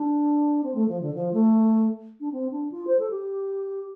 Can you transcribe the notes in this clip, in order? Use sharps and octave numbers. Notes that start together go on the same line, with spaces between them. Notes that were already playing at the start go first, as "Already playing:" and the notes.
Already playing: D4
C4
A3
F3
D3
F3
A3
D4
C4
D4
F4
C5
A4
G4